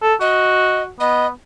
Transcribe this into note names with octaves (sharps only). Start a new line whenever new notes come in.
A4
F#4 D#5
B3 D#5